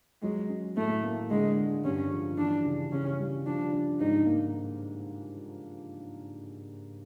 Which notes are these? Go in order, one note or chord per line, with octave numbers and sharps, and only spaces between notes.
F#3 G#3
C#4
A2 A3
A#3
D3 G#3
G#3
G2 C#4
F3
E3 D4
C#3
C#3 C#4
G3
F3 D4
D4
G#2 D#4
A#3